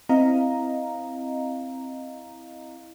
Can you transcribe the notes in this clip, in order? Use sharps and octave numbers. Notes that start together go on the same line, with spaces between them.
C4 E4 D#5 F5 A#5